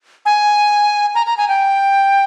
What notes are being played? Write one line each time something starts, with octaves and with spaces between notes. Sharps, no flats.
G#5
A#5
A#5
G#5
G5